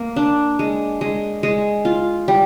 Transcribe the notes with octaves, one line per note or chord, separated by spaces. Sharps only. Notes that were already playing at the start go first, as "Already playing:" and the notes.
Already playing: A#3
D4
G#3
G#3
G#3
F4
G3